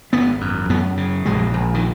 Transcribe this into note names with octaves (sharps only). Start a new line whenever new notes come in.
G#1 B3
F#2
F#2 B3
C#3
A#1 G#3
A#1
D#3